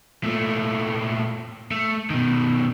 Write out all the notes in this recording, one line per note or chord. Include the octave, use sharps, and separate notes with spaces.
A#2 A3
A3
B2 D#3